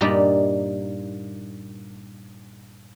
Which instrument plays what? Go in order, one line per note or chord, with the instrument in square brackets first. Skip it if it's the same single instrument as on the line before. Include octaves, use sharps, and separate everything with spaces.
[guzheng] G2 A#2 G3 A#3 D#4